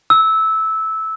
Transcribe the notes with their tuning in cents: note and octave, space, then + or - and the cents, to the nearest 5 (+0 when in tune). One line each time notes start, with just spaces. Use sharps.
E6 -15